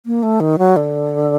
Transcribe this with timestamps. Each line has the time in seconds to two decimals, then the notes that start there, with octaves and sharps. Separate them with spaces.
0.06 A#3
0.23 A3
0.40 D#3
0.59 F#3
0.76 D3